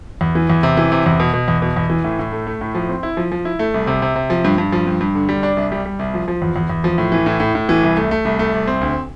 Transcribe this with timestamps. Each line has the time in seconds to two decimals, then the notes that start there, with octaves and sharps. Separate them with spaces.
0.21 E2
0.35 E3
0.50 E2
0.63 C3
0.77 E3
0.92 C3
1.06 E2
1.20 B2
1.33 B2
1.48 E2
1.62 B2
1.77 E2
1.90 E3
2.04 A2
2.19 A2
2.32 A3
2.47 A3
2.61 A2
2.75 F3
2.89 C4
3.03 E4
3.17 F3
3.32 F3
3.45 E4
3.59 A3
3.74 C2
3.87 C3
4.02 C3
4.16 C3
4.30 F3
4.44 G2
4.58 G2
4.72 F3
4.87 G2
5.01 G2
5.15 D3
5.29 G3
5.43 D4
5.57 C2
5.72 G3
5.86 G3
5.99 C2
6.14 F3
6.28 F3
6.42 E2
6.56 E2
6.70 E2
6.84 F3
6.98 A2
7.12 E3
7.26 A2
7.40 A2
7.55 A2
7.69 E3
7.83 C2
7.97 A3
8.11 A3
8.25 C2
8.39 A3
8.53 C2
8.67 C4
8.81 D2